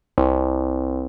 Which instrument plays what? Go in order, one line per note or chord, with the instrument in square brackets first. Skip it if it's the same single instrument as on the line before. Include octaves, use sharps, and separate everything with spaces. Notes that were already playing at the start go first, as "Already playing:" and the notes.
[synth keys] C2